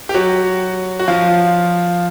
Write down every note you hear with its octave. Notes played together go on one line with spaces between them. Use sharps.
G4
F#3 F#4
F#4
F3 F4